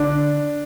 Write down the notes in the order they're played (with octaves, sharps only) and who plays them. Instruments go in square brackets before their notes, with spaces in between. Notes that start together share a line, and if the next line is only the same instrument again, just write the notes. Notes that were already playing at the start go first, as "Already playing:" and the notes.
Already playing: [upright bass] D3 [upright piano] D4